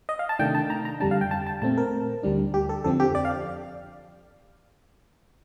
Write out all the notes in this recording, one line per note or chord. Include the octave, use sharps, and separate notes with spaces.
D#5
F5
A5
C3 D#3 A3 D4 G5
A5
A#5
A#5
F2 D3 G3 D4 A5
F5
G5
A5
A5
A#2 A3 C4 A5
A#4
D2 D3 G3 D4
G4
A4
F2 D3 F3 C4 A4
G4
D5
F5